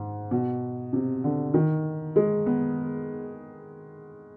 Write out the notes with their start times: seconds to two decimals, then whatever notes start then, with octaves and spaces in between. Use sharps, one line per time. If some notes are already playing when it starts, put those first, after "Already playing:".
Already playing: G#2
0.31 B2
0.93 C3
1.24 D3
1.54 D#3
2.16 G#3
2.46 B3